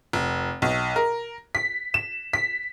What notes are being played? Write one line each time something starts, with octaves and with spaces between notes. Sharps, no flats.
F1
B1
A#4
B6
E7
B6